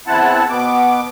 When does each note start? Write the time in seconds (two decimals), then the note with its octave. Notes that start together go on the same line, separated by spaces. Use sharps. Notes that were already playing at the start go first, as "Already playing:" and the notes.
0.07 E2 C4 E4 F#5 A5
0.50 B2 B3 D6